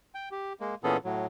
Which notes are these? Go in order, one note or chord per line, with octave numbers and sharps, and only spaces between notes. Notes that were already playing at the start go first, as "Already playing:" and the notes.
G5
G4
G#3 A#3
A#2 E3 B3 C#4 G#4 A4
A2 F#3